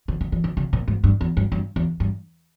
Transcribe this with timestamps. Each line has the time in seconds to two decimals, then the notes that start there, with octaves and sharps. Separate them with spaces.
0.08 D#3
0.21 D#3
0.32 E3
0.44 D#3
0.57 C#3
0.73 A#2
0.88 G#2
1.04 G2
1.21 E2
1.37 G2
1.52 G2
1.76 E2
2.00 G2